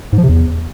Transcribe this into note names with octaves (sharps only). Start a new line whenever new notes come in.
G#2
F3
C3
E2